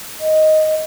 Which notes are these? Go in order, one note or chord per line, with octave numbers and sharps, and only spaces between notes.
D#5